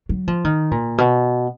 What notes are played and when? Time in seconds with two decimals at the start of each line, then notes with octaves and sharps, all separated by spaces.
0.09 F#3
0.28 F3
0.44 D#3
0.71 A#2
0.98 B2